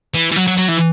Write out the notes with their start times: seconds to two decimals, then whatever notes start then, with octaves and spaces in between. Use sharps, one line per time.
0.14 E3
0.31 E3
0.36 F#3
0.47 F#3
0.58 F#3
0.68 E3